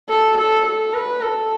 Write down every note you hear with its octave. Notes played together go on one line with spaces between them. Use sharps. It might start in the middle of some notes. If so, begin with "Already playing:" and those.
A4
A4
A4
B4
A4